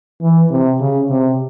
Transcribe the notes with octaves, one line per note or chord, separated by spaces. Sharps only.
E3
C3
C#3
C3